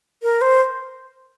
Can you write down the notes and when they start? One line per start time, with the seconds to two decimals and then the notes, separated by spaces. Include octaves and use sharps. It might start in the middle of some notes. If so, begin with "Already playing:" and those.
0.23 A#4
0.41 C5